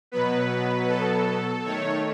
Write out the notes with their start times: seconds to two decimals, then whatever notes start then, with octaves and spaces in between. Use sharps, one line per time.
0.12 B2 F#3 B3 B4
0.88 A4
1.64 D#3 A3 C#5